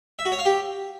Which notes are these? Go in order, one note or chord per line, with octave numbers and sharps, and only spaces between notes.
E5
F#4
C#5
F5
G4